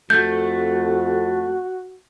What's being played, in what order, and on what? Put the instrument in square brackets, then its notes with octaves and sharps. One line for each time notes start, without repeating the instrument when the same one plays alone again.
[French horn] F2 [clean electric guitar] A3 [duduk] F#4 [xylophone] G6